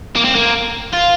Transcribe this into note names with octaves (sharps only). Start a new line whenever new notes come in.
A#3
C4
A#3
F4